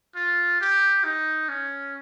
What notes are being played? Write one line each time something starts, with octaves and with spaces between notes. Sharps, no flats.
F4
G4
D#4
C#4